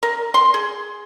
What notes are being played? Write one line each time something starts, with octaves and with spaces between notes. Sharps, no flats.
A#4
C6
G#4